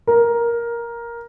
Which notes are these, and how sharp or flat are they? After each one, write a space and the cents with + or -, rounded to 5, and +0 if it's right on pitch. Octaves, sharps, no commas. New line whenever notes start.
A#4 +10